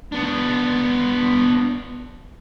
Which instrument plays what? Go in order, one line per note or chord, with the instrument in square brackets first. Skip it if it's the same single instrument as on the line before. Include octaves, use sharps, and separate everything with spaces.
[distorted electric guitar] B3 D4